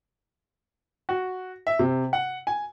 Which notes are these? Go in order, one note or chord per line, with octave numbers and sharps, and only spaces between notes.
F#4
E5
C3
F#5
G#5